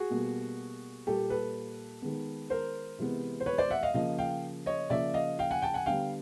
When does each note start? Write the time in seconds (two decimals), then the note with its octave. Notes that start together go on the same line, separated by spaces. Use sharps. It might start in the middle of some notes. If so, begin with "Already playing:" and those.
Already playing: F#4 G#4
0.10 B2 G3 A#3
1.07 A#2 G3 A#3 G4 A4
1.30 A4 B4
2.02 D#3 G#3 B3
2.50 A#4 C5
2.99 C3 E3 G#3 B3
3.40 C5
3.46 B4 C#5
3.58 C5 D5
3.70 E5 F#5
3.83 D#5 F5
3.94 C#3 F3 A#3 D#5 F5
4.18 F5 G5
4.66 C#5 D#5
4.90 C#3 F3 A#3 D5 E5
5.14 D#5 F5
5.39 F5 G5
5.51 F#5 G#5
5.62 G5 A5
5.74 F#5 G#5
5.86 D3 G3 B3 F5 G5